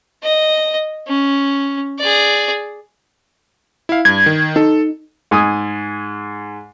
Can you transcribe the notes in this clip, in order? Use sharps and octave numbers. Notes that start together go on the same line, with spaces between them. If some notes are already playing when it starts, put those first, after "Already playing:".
D#5
C#4
G#4 D5
E4 F5
G2 G#6
D#3
D#4 A4
G#2 G#5 D#6